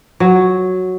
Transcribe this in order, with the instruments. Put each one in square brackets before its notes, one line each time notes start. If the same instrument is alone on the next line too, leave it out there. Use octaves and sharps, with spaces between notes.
[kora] F#3